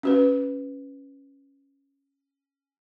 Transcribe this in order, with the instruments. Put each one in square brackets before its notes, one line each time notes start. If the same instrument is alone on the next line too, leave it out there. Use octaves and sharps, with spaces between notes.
[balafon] C#4 F#4 B4